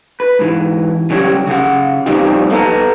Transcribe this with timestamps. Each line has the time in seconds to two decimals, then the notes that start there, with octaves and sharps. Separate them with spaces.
0.20 B4
0.39 G#2 E3
1.10 C#3 F#3 G3 G4 C#5
1.47 C#3 G#4 F#5
2.06 A#2 F3 G3 C4 D#4 G4
2.50 B3 A4 B4 F5 A5 A#5